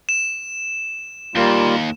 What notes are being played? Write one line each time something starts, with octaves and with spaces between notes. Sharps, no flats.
E7
D#2 G3 A#3 F4